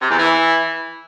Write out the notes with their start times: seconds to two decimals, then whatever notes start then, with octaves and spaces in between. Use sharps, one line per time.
0.01 C3
0.09 E2
0.18 E3